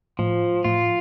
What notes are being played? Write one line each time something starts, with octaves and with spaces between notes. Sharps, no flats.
A2 F3
A2 F4